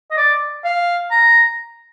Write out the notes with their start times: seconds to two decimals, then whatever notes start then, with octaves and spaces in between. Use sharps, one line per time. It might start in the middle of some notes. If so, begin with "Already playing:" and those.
0.11 D#5
0.17 D5
0.64 F5
1.11 A#5